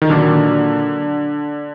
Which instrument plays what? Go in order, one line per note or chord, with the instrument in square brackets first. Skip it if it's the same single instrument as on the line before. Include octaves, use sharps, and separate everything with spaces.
[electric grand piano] D#3
[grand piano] A#2 F#3 D4 [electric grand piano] D3